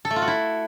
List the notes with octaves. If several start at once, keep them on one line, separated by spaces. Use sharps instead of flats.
A4
A3
F4
F#4
E4